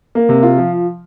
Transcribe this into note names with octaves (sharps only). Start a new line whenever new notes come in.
A#3
C3
F4
F3